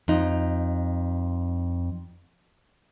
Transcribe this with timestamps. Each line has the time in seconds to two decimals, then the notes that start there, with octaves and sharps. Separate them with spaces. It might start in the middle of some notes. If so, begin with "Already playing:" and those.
0.08 F2 D#4